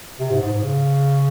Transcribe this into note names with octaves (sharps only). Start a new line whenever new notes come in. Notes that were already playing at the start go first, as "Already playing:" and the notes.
C3
G#2
G#2
G#2
C#3